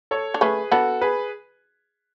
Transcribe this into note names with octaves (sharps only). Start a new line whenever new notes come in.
A4 C#5
D4
A3 C#4 G#4 B4
B3 D4 F#4 A4
G#4 B4